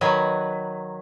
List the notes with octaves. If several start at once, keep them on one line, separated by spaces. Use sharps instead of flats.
D#3 F#3 B4